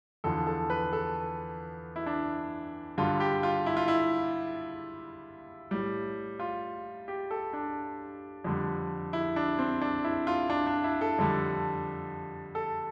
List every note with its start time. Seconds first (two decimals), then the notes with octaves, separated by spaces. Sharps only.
0.24 E2 D3 F3 A4
0.47 A4
0.70 B4
0.93 A4
1.96 E4
2.06 D4
2.98 G2 D3 G3 F4
3.20 G4
3.43 F4
3.66 E4
3.77 F4
3.88 E4
5.71 A2 G3
6.40 F4
7.08 G4
7.31 A4
7.53 D4
8.44 F2 D3 G3
9.13 E4
9.36 D4
9.59 C4
9.81 D4
10.04 E4
10.27 F4
10.50 D4
10.67 D4
10.84 E4
11.01 A4
11.18 F2 D3 G3
12.55 A4